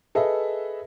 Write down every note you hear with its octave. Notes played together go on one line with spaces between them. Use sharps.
G#4 A4 B4 D#5 E5